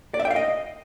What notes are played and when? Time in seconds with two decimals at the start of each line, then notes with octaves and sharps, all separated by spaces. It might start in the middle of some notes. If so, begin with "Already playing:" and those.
0.14 D5
0.20 E5
0.25 G5
0.31 F5
0.36 D#5